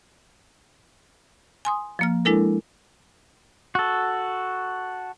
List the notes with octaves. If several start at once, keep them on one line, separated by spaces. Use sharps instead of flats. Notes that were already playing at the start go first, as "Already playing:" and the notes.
G#5 C6 D#6
F3 A#3 F6
G#3 D4 E4 A4 A#4
F#4 A4